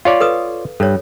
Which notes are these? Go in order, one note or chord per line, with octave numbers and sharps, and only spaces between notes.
F4 C#5 D5 F5
A4 B4 D#6
G2 A4 C#5